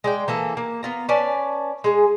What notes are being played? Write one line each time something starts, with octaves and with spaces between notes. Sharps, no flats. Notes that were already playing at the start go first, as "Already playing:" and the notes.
G#3 D5 G5
E3 A#3 A4
A#3
B3 F4 A#5
C#4 B4 D5 A5
G#3 G#4